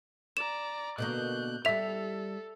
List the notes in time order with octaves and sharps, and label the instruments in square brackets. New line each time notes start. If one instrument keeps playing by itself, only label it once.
[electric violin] D5 A#5 [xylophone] E7
[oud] B2 D3 A#3 [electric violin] F#6 G6
[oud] G3 E4 [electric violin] A4 [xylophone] E5 F7